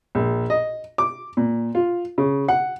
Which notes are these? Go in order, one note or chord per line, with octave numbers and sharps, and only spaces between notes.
A#1
D#5
D6
A#2
F4
C#3
F#5